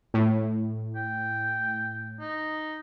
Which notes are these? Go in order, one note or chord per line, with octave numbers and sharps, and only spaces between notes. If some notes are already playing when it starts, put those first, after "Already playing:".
A2
G5
D#4